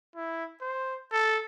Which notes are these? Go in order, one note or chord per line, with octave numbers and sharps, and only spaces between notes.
E4
C5
A4